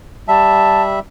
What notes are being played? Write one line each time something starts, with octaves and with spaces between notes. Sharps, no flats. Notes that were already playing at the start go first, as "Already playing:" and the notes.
G3 E5 A5